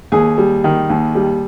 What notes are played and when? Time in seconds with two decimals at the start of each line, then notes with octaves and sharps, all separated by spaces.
0.12 D#2 G#4
0.38 G3
0.64 D#3
0.90 D#2
1.15 G3